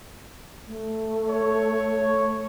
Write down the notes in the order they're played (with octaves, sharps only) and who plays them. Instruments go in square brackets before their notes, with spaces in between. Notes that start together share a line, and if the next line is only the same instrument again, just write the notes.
[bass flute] A3
[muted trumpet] C#5